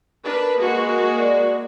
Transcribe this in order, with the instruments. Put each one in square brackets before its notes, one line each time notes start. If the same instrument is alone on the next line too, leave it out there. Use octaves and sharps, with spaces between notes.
[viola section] D4 A#4 B4
G#3 A#3 F#4
[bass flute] D5